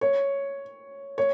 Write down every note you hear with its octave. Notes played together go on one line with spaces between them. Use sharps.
C#5
C#5